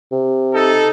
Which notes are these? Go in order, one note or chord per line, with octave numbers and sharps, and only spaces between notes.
C3
D#4 A4